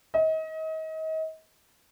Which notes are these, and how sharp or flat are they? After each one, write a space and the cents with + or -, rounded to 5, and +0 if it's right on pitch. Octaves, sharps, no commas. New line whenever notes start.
D#5 +35